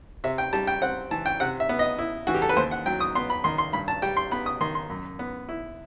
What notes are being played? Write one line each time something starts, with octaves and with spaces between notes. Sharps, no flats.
C3 E5
G5
G3 A5
G5
C4 F#5
E3 A5
G5
C3 F#5
E5
B3
D#5
E4
E3 F#4
G4
A4
B4
D#2 C5
F#5
F#3 G5
D#6
B3 C6
B5
D#3 C6
C6
G2 B5
A5
G3 G5
C6
B3 B5
D#6
D#3 C6
C6
F#2
B3
E4